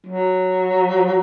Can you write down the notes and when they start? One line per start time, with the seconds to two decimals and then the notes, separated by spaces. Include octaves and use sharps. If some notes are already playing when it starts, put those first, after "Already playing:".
0.07 F#3